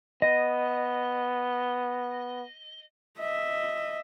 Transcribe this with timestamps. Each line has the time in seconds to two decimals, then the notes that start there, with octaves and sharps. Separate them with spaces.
0.22 B3 D#5
3.18 D#5 E5